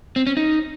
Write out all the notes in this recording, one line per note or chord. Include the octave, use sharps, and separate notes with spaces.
C4
C#4
D#4